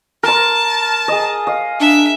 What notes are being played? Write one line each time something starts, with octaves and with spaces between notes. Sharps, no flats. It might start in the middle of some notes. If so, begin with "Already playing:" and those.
A#4 A5 C6
G#4 D#5
D#5 F5
D4 E5